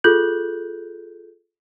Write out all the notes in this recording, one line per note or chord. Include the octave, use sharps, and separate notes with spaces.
F4 G#4 A4 F#6 G6 F#7